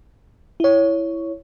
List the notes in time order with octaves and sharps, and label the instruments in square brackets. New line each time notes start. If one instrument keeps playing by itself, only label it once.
[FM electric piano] E4 C#5